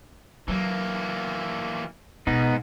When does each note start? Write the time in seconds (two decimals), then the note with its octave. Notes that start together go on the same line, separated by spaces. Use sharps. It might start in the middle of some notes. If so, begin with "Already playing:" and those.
0.48 E3 F#3 A#3
2.27 D1 G#2 B2 B3 D#4